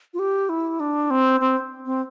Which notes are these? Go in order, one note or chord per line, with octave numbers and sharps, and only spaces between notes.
F4
G4
E4
D4
C4
C4
C4